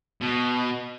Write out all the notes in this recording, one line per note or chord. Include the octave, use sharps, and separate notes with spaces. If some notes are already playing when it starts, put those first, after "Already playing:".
B2